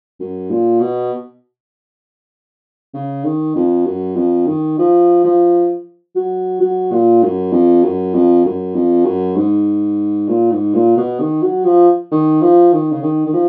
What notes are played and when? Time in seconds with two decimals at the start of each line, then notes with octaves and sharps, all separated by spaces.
0.20 F#2
0.50 A#2
0.81 B2
2.94 C#3
3.25 D#3
3.55 F2
3.86 F#2
4.16 F2
4.47 D#3
4.78 F3
5.24 F3
6.16 F#3
6.61 F#3
6.92 A#2
7.23 F#2
7.52 F2
7.84 F#2
8.15 F2
8.45 F#2
8.75 F2
9.05 F#2
9.36 G#2
10.28 A#2
10.51 G#2
10.74 A#2
10.97 B2
11.20 D#3
11.42 F#3
11.65 F3
12.11 D#3
12.42 F3
12.72 D#3
12.92 C#3
13.02 D#3
13.26 D#3
13.33 F3